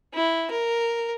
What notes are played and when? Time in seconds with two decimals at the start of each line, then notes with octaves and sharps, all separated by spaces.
0.14 E4
0.51 A#4